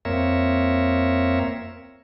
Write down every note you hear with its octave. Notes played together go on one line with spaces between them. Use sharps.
F2 A#3 C4 A#4 C#5 E5